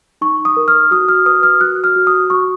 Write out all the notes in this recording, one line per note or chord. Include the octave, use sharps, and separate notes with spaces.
D#4 C#6
D#6
A#4
F6
F#4 D#6
F6
B4 D#6
F6
F#4 F#6
F6
F#4
D#6
F#4 C#6